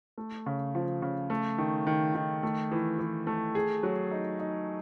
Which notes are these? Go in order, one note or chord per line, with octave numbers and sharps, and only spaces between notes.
A3
C#3
F3
C#3
A3
D#3
D#3
D#3
A3
E3
E3
A3
G#4
F#3
D#4
D#4